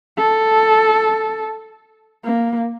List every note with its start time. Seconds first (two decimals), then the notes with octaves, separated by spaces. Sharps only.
0.17 A4
2.25 A#3